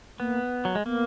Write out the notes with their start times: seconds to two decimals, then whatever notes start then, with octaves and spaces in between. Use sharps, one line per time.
0.19 A#3 B3
0.65 F#3
0.75 G#3
0.85 A#3 B3